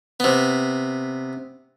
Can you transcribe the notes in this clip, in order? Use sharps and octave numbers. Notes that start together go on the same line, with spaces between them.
C3 B3